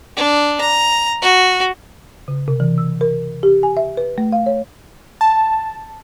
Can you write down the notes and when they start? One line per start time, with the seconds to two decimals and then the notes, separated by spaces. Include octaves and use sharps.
0.16 D4
0.61 A#5
1.22 F#4
2.28 C#3
2.48 C3
2.60 E3
2.78 E6
3.01 A#4
3.43 G4
3.63 G#5
3.77 E5
3.97 B4
4.18 A3
4.32 F5
4.46 C#5
5.21 A5